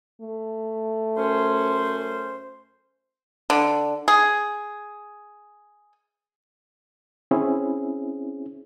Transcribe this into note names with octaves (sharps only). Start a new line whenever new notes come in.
A3
F#2 C#4 C5
D3
G#4
C4 C#4 E4 G#4